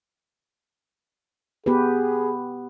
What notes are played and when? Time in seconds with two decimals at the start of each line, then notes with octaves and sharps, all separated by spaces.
1.66 B3 G4 G#4 B4